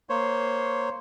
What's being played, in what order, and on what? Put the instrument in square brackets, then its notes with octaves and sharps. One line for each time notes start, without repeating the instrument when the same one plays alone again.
[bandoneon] A#3 C5 C#5